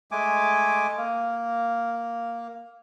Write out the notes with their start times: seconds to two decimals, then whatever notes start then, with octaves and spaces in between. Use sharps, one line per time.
0.11 G#3 A3 G#5 D6
0.97 A#3